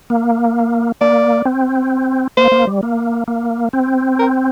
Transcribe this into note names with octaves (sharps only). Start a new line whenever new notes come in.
A#3
A#3 D5
C4
A#3 C5
A#3
G3
A#3
A#3
C4
A#4